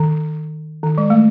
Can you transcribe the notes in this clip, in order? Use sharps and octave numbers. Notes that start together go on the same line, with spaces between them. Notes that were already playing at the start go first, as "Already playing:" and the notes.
Already playing: D#3
D#3
G#3
A3